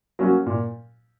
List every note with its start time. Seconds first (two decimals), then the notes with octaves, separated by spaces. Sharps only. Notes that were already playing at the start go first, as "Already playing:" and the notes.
0.19 F#3 A#3 C#4 F#4
0.46 A#2